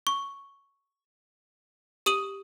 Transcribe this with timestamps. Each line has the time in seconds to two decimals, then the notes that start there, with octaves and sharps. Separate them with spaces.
0.07 C#6
2.06 G4 D#6 D#7 F#7